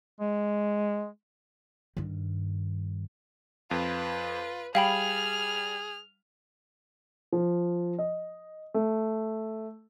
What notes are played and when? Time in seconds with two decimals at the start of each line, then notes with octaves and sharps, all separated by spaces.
0.20 G#3
1.97 G2 D#3
3.71 F2 F4 B4
4.75 G3 G#4 F5 G5 B5 F6
7.33 F3
7.99 D#5
8.74 A3